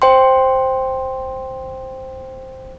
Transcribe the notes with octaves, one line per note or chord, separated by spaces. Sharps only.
C5 G5 C6